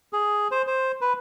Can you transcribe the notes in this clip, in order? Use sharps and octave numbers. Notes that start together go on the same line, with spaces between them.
G#4
C5
C5
B4